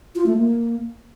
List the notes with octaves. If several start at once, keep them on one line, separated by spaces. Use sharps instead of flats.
F4
A3
A#3